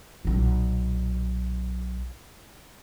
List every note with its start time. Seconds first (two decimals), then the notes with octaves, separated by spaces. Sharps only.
0.25 B1 A#2